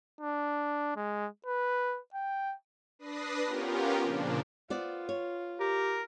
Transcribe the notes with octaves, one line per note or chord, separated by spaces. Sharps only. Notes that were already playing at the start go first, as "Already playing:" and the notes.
D4
G#3
B4
G5
D4 B4 D#6 A#6 C7
B3 C#4 F4 G4 A#4
A#2 C#3 F3 A#3 D4
B3 F4 C5 D5
C#5
G4 A#4